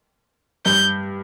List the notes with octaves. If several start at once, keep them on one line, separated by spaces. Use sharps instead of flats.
G2 G6